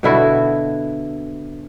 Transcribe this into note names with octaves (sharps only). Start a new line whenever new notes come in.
B2 D3 E4 F#4